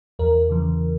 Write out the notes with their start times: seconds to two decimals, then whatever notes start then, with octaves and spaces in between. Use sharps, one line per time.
0.19 E2 A#4
0.49 C#3 E3